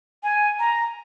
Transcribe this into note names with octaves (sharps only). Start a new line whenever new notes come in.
G#5
A#5